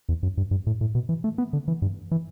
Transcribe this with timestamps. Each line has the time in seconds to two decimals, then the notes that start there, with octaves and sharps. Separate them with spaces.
0.09 E2
0.23 F#2
0.37 G2
0.51 G2
0.67 A2
0.81 A2
0.95 B2
1.09 E3
1.24 A3
1.38 B3
1.53 D3
1.68 E3
1.82 G2
2.11 E3